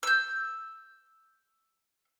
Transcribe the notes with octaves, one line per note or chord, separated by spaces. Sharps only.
E6 G6